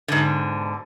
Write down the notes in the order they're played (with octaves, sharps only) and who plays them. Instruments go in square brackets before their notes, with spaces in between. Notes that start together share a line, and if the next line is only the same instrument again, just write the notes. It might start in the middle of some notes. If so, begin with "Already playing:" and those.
[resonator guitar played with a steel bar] G#2 B2 D3